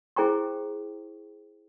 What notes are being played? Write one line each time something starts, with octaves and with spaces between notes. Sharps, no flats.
E4 G#4 C5 G5 A#5 C#6